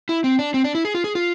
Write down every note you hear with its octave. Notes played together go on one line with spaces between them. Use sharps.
E4
C4
D4
C4
D4
E4
G#4
F4
G#4
F4